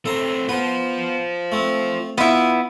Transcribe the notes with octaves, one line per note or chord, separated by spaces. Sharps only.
A3 C4 A4 A#5
B3 F4 B4 C5
A3 C4
B3 E4 F4 B4